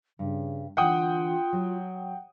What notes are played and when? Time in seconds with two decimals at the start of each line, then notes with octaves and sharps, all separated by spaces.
0.19 G2 C#3
0.77 D3 E3 F4 F#5 G5 D#6
1.53 F#3